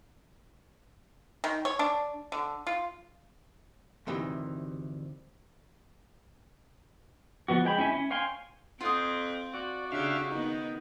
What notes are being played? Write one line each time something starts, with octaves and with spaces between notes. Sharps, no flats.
D#3
C#5
D4
D3
F4
D2 G2 C3 D#3 E3
F3 B3 F#4
G#3 G5 B5
C#4 E4 E5 G#5
C#4
C#5 F5 G5 G#5 C6
F2 C4 F4 D#6
F#4 D5
C#3 D4 G4 E5 F5
D#3 B3 D#4